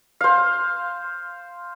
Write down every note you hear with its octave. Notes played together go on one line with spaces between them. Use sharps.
C5 F5